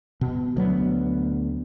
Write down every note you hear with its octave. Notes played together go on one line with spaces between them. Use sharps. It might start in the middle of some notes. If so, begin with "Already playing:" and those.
B2
D2 F#3 B3